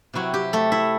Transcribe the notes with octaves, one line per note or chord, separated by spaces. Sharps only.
C3 F#3 C4 E4 F#4
G4
A3 A4
E4 E5